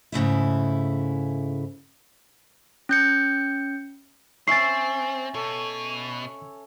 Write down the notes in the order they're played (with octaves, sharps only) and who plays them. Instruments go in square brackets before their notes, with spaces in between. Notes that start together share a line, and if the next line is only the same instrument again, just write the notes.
[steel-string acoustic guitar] G#2 C#3 A3 E4
[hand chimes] C#4 G6 C#7
[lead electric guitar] C4 [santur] C#4 E5 G#5 [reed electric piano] C#6 A6 [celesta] C7
[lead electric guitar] B2 [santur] A4 C#5